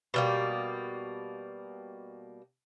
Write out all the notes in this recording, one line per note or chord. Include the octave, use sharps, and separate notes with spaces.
B2 G3 A#3